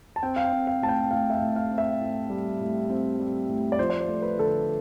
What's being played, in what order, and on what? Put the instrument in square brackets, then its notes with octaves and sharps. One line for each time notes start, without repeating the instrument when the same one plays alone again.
[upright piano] A5
C4 G5
F5
G5
C4
F5
A2 A5
G5
A2 F5
E5
F5
A2
F5
C4
E5
A2
G3
A2
C4
G3
A2
D5
F3 C5
D5
C5
A3
B4
D3 A4
B4